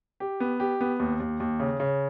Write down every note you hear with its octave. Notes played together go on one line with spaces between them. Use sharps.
G4
B3
G4
B3
D#2
D#2
D#2
C#3
C#3